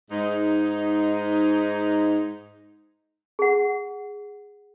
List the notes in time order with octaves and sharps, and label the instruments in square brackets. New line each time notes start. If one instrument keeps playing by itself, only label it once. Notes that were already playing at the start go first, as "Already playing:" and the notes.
[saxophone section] G#2 D#4
[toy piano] G#4 F#5